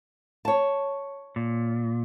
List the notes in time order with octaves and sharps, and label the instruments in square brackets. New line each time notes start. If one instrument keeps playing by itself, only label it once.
[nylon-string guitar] C#5 A5
[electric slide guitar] A#2